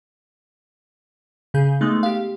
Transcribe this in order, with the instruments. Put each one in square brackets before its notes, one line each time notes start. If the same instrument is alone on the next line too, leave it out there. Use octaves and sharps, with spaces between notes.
[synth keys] C#3 G#4 G6
G#3 A3 B3 D#4
G4 F5